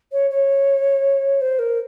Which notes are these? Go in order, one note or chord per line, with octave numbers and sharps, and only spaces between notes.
C#5
C#5
C5
A#4